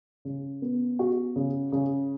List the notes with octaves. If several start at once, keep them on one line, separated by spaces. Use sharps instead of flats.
C#3
B3
F#4
C#3
C#3